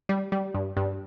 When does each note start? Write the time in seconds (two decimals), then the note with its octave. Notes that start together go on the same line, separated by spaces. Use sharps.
0.09 G3
0.32 G3
0.54 G2
0.77 G2